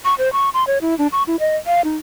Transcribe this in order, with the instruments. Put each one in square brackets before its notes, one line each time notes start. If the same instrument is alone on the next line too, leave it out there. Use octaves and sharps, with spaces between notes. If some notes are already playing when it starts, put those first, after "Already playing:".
[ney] C#6
C5
C#6
C6
C#5
E4
D4
C#6
E4
D#5
F5
D#4